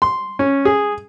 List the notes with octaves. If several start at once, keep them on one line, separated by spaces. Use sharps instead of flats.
C6
C#4
G#4